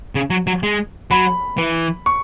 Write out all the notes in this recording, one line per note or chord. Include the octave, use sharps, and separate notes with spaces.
C#3
F#3
F#3
G#3
F#3 B5
E3
C#6